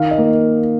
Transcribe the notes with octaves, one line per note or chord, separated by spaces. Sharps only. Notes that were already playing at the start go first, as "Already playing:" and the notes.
Already playing: D#3 F5
D#5
A#3